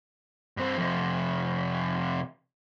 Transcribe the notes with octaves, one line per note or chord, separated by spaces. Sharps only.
G2 C4
F2 C3